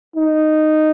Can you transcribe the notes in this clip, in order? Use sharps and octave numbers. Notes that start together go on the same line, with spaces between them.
D#4